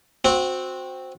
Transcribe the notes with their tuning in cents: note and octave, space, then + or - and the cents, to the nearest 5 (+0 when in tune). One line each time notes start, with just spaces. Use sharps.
C4 +0 F#4 -20